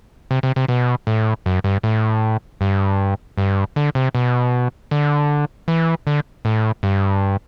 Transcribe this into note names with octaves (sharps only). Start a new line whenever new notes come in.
C3
C3
C3
B2
A2
F#2
G2
A2
G2
G2
D3
C3
B2
D3
E3
D3
A2
G2